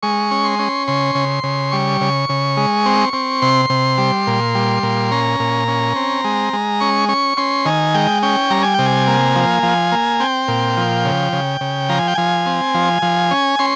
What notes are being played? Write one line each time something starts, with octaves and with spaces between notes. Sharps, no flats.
G#3 C#6
C#4
C6
C#4
C#3 C6
C#3
C#3
G3 C#6
C#3
C#3
G#3
C4
C4
C3 C6
C3
G3
A#2
G3
A#2
C#4 A#5
A#2
C#4
C4
G#3
G#3
C#4 C#6
C#4 C#6
C#4 C6
D#3 G#5
G#3 G5
C#4 G5
G3 A#5
G#5
C3 G5
G#5
A#3
F3
F3
A#3
C4 G5
A#2
F3
C#3
C#3
C#3
F3 A#5
G#5
G5
F3 G#5
C4
F3
F3
C#4
C#4 C6